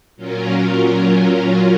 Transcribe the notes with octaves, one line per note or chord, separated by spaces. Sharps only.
A#2 F#3 C#4 F4 A#4